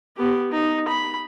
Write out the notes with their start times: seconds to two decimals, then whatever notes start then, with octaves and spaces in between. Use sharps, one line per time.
0.16 B3 G4
0.52 D#4
0.88 B5